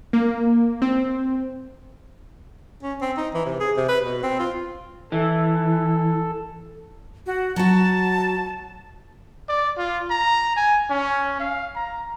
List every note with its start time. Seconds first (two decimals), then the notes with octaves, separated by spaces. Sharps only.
0.13 A#3
0.82 C4
2.83 C#4
3.01 C4
3.17 D#4
3.34 E3
3.46 C3
3.60 G#4
3.77 C3
3.89 B4
4.04 B2
4.23 C4
4.40 F4
5.12 E3 A4
7.26 F#4
7.56 F#3 F#4 A5
9.48 D5
9.78 F4
10.10 A#5
10.56 G#5
10.90 C#4
11.40 F5
11.76 A#5